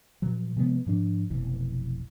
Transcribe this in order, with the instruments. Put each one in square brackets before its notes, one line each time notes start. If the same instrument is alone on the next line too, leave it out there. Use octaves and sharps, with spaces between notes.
[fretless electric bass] A#2 F3 F#3
C3 F3 G#3 B3
G#2 F3 D4
F1 B1 E3